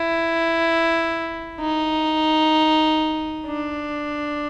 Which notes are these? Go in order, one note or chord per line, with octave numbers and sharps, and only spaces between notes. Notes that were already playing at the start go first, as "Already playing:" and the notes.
Already playing: E4
D#4
D4